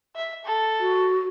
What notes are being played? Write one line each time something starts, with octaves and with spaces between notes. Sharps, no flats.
E5
A4
F#4